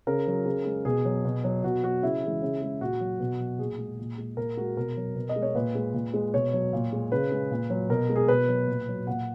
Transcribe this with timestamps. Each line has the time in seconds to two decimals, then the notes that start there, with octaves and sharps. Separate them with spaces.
0.07 C#3 A#4
0.27 F#3
0.46 C#3
0.65 G#3
0.85 B2 G#4
1.05 F#3
1.25 B2
1.44 F#3
1.63 B2 F#4
1.83 F#3 F#4
2.02 C#3 E4
2.23 E3 G#3
2.42 C#3
2.62 G#3
2.81 A#2 F#4
3.00 F#3
3.20 B2
3.39 F#3
3.59 A#2 G#4
3.78 G#3
3.99 A#2
4.18 G#3
4.37 A#2 A#4
4.57 G#3 F#4
4.77 B2 A#4
4.97 F#3
5.16 B2
5.29 D#5
5.36 G#3
5.42 C#5
5.55 A#2 B4
5.75 G#3
5.94 A#2
6.14 G#3
6.34 B2 C#5
6.53 F#3
6.73 A#2
6.93 G#3
7.12 C#3 B4
7.31 G#3
7.51 A#2
7.70 F#3
7.89 B2 A#4
8.09 G#3
8.16 G#4
8.28 B2 B4
8.48 F#3
8.68 A#2
8.88 F#3
9.07 A#2 F#5